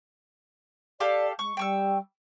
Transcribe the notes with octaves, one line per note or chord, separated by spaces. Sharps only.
G4 A4 D5 F5
G#3 C#6
G3 G5 C#6 E6